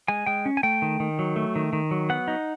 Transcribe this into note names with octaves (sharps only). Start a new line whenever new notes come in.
G#3 G#5
G#3 G5
C#4
G#5
A3 G5
D#3
D#3
F#3
A3
D#3
D#3
F#3
B3 F#5
D#4